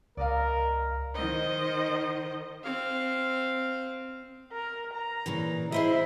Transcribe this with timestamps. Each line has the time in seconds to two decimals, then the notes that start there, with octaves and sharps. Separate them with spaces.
0.17 C#2 A#4 D5 D#5 F5
1.14 D#3 C5 D#5
2.64 C4 F5
4.52 A#4
4.94 A#5
5.26 A#2 C#3 E3
5.72 E4 G#4 C5 D#5